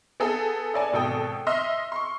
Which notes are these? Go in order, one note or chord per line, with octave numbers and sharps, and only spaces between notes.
B3 G#4 A4
A4 D5 G#5
G#1 B2 A4 G5 D#6
D#5 E5 C6 E6 F6
C6 C#6